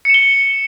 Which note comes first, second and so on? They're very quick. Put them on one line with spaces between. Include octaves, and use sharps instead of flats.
C#7 E7 G7